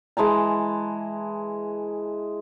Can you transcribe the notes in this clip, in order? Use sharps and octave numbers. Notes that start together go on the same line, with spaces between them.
E3 G#3 A5 A#5